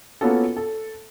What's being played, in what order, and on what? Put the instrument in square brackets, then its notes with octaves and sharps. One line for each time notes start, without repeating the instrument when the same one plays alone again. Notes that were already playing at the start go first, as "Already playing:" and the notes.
[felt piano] A#3 B3 C#4 F4 F#4 A4
A4